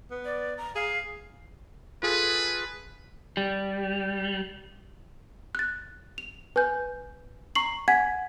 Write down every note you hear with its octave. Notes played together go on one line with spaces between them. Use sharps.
B3
D5
A#5
G#4 F5
F4 G#4 A4 B4
G3
F#6 A6
F7
B4 G#5 G6
A#5 C#6 C7 F#7
F#5 G#5 G#6 B6